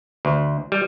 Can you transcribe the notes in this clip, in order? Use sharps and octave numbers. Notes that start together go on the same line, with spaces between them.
D2
G3